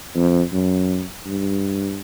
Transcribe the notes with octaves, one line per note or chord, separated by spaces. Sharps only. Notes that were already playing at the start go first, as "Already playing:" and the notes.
F2
F#2
G2